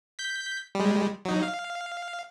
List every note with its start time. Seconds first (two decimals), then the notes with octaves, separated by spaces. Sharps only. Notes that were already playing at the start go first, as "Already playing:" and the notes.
0.19 G6 B6
0.75 G3 G#3
1.25 F#3 D#4
1.43 F5